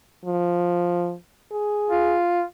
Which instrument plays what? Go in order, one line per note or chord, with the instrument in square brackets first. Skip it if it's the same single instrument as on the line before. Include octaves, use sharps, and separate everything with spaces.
[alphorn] F3
G#4
[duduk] F4